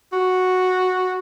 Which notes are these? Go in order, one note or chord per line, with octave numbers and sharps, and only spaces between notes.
F#4